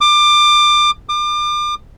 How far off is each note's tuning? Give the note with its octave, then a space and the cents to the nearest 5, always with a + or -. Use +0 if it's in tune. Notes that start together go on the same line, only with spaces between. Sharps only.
D6 +25
D6 +35